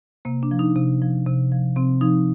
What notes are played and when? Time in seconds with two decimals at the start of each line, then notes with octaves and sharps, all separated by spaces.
0.25 C3 A#3
0.43 D4
0.51 F3
0.59 D#4
0.76 C3
1.02 F3
1.26 C3
1.52 F3
1.76 C3 C4
2.01 F3 D#4